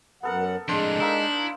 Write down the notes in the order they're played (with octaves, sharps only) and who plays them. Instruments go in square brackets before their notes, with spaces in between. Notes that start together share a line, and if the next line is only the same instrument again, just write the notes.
[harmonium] F#2 F#5 [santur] B3 A4 A#4
[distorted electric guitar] F2 A2 [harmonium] G#3 [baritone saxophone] D4 [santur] C5
[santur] A#3 D#4 E6 [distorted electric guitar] E4